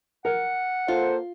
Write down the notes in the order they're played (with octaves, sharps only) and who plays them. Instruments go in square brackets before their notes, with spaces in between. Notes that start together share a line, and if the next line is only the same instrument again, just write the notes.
[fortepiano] A#4 [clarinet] F#5
[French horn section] A#3 A4 C5 [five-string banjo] F4